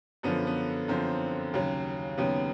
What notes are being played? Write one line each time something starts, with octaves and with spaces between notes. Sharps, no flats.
F#2 D3 F3 B3
B3
F#2 D3 F3 C4
D#2 C#3 F#3
D#2 C#3 F#3 B3